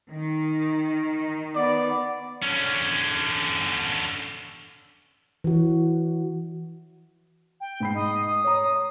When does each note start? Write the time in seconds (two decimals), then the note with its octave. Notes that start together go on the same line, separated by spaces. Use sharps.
0.11 D#3
1.56 B3 D5
2.43 D3 C#4
5.44 E3 F#4
7.60 G5
7.80 G#2 B5 C7
7.94 D#5
8.26 D#6
8.44 C#5 A#5